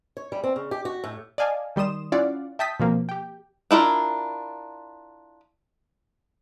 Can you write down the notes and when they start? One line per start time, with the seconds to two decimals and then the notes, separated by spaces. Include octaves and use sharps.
0.17 C#5
0.32 G3
0.44 C4
0.56 C#3
0.71 G4
0.85 F#4
1.04 A2
1.38 D5 D#5 F5 G#5 A5
1.76 D#3 G3 C6 D#6 E7
2.12 C#4 E4 F4 D5 F5 F#5
2.59 E5 G5 A5 D#6 G6 B6
2.80 B2 F3 A#3 C4
3.09 G4 G5
3.71 D4 E4 F4 A#4